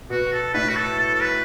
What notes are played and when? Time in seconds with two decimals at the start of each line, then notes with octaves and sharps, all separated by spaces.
0.10 B2 F#4
0.33 A4
0.54 A2 B4
0.69 F#4
0.76 A4
0.99 A4
1.14 A4
1.21 B4